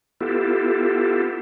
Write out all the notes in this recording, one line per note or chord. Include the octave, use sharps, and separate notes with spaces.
B3 E4 F4 G4 A4